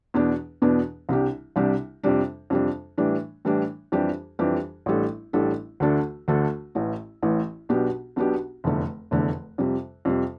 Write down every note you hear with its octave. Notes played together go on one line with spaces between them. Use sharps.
E2 B2 B3 D4
E2 B2 B3 D4
C2 C3 G3 D4 G4
C2 C3 G3 D4 G4
F2 C3 G3 D4
F2 C3 G3 D4
A2 E3 G3 D4
A2 E3 G3 D4
F2 E3 G3 D4 G4
F2 E3 G3 D4 G4
A1 A2 G3 D4 A4
A1 A2 G3 D4 A4
D2 D3 A3 D4 A4
D2 D3 A3 D4 A4
A1 A2 E3
A1 A2 E3
B1 B2 B3 D4 G4
B1 B2 B3 D4 G4
F1 E2 D3 A3
F1 E2 D3 A3
F2 C3 G3
F2 C3 G3